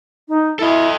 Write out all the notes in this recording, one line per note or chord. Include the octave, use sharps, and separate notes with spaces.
D#4
E4 A4 D#5